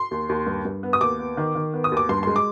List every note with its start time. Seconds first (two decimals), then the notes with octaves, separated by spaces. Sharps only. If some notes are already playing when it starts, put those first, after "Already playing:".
Already playing: C6
0.11 D#2
0.29 D#2
0.47 G2
0.65 G2
0.83 B3
0.93 D#6
1.01 D#2 D6
1.19 B3
1.37 D#3
1.55 D#3
1.74 B3
1.84 D#6
1.92 D#2
1.97 D6
2.09 G2 C6
2.23 G#3 C6
2.36 D6